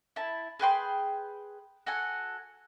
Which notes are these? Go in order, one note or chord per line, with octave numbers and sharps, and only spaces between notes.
E4 A5
G#4 B4 G5 C6
F#4 A4 F#5 G#5